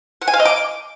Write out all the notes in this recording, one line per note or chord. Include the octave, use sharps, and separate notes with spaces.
F#5
G#5
F5
D#5
D6